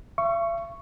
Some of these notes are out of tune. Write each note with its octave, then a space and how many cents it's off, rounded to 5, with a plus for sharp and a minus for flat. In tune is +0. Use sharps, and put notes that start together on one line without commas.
E5 +45 C#6 +0